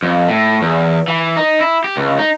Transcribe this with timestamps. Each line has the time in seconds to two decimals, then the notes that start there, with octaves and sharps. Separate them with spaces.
0.03 F2
0.28 A2
0.62 E2
1.08 E3
1.37 D#4
1.61 E4
1.84 G4
1.97 C#2
2.19 D#4